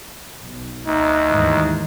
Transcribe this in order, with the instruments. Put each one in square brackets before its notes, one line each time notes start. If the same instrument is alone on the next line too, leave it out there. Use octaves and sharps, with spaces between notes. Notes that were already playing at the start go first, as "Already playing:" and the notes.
[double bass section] B1
[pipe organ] D2 [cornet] D#4
[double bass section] D#2 G#2 E3